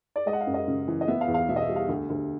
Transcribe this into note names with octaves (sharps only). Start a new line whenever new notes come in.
D5
G#3 D#5
F#5
F5
F#2
D#5
C#3
E3
D#5
B3 E5
F5
E2
F5
B2 E5
D#5
E5
G3
F5
D2
D2